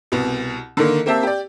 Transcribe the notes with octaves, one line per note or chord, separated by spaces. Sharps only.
C2 B2
D3 D#3 A#3
A#3 C4 G4 E5 A5
G4 D5